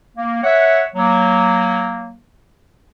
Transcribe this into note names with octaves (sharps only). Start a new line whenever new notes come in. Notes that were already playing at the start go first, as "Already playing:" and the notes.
A#3
C#5 E5 F#5
F#3 A#3